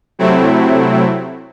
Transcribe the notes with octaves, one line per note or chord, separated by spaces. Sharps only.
C3 F#3 A3 C4 E4